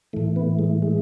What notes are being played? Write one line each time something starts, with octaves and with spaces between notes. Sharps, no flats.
A2 E3 A3
B3
G#3
G#3